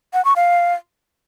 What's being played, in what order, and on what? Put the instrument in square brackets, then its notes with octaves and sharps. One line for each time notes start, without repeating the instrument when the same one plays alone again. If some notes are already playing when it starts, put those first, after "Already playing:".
[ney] F#5
C#6
F5